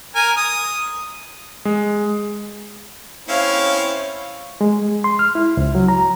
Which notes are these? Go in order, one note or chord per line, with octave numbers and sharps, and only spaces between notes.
A#4 G#5
D#6
G#3
C4 C#4 E4 C#5 F5
G#3
C6
F6
E4
C#2
F#3
A#5